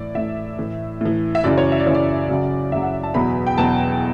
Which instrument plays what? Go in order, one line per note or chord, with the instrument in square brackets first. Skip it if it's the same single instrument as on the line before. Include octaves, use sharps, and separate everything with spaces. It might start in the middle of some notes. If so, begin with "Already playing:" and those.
Already playing: [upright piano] A2 E3 D5
A2 E3 E5
A2 E3
A2 E3
E5
F#2 C#3 E3 D5
C#5
E5
D5
F#2 C#3 E3 C#5
D5
F#2 C#3 F#3
F#2 C#3 F#3 E5
F#5
A5
E2 B2 F#3 B5
G5
E2 B2 F#3 A5